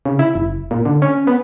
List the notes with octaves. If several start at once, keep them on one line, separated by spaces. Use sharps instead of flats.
C#3
E4
F#1
A#2
D3
C#4
B3